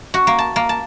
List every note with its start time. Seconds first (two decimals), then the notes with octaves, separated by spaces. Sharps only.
0.14 F#4
0.27 A#3
0.38 A5
0.56 A#3
0.69 A5